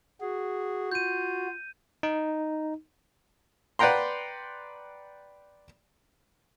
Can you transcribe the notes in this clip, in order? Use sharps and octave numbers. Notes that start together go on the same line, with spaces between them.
F#4 G#4
F4 G6 D#7
D#4
B4 D5 F#5 G5 A#5 C6